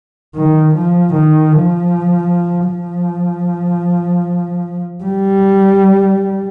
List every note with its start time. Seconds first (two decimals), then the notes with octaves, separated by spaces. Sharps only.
0.35 D#3
0.75 F3
1.14 D#3
1.53 F3
2.70 F3
5.05 G3